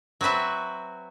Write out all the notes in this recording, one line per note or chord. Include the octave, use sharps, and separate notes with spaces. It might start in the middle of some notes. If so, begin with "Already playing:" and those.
F#3 C4 F#4 B4 E5